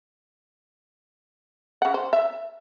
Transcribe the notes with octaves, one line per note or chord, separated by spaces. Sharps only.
C#3 F#5
C5
E5